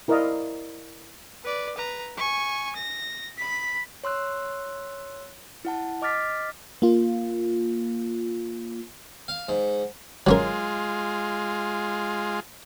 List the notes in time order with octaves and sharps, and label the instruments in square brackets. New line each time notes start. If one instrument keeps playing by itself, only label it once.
[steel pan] E4 A#4 C5 D5 D#5 F5
[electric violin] B4 D5
B4 A#5
G#5 C#6
A#6
B5 B6
[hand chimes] C#5 C6 E6 F#6
E4 F#5 A5
D#5 D6 F6 A6 B6
[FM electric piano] A#3 F4
[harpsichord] F5
G#2
[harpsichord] F#3 C#4 A#4 [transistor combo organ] G#3 F4